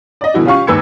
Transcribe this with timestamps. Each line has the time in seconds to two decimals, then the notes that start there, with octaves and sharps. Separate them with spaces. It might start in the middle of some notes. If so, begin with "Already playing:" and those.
0.21 D5 D#5
0.34 B2 D3 E3 E4 F#4
0.45 C#4 F4 G4 F5 C#6
0.67 D#2 G#2 B4 E6 G#6 C#7